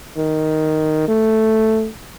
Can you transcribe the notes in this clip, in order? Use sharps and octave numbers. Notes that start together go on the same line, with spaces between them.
D#3
A3